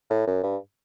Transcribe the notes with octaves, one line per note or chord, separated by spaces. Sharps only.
A2
F#2
G2